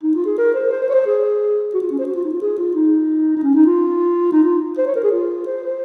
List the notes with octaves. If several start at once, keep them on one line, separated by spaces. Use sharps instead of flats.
D#4
F4
G#4
A#4
C5
C5
C5
C#5
C5
G#4
F#4
F4
C#4
C5
F#4
F4
D#4
F4
G#4
F4
D#4
D#4
C#4
D#4
F4
D#4
F4
C5
C#5
A#4
G#4
F4
C5
C5